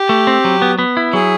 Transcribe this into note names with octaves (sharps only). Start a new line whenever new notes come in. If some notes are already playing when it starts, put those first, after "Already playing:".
Already playing: G4
A3
C4
F#3
B3
B3
E4
F#3 G#4